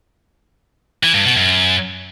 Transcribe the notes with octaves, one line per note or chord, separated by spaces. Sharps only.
E3
G2
B2
F#2